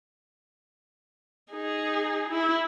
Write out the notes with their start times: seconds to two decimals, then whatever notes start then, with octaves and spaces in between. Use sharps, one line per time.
1.52 D#4 G#4
2.30 E4